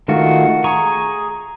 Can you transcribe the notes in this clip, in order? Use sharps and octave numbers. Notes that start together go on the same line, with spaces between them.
D#3 A3 F4 F#4
G#4 A#5 C#6